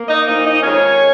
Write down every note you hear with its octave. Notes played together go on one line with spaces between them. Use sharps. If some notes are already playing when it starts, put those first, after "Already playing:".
Already playing: A#3
D#4 D#5
A#2 F3 A#3 D#4 D#5
D#4 D#5
F2 D#3 G#3 C#4 C#5